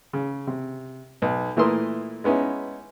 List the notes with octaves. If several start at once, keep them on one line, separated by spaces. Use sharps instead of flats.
C#3
C3
B1
A#2 E3 A3 A#4 C6 D#6
G#3 B3 C#4 D#4 E4